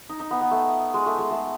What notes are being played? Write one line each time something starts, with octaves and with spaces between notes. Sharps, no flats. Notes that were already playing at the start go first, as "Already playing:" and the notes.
D#4
D#4
B3
B3
A3
G#3
A3
G#3
A3